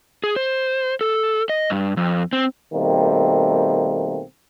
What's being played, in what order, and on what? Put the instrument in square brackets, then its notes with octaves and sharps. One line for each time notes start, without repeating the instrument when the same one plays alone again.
[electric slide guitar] G#4
C5
A4
D#5
G2
F2
C4
[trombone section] B2 D#3 G3 A3 A#3 C4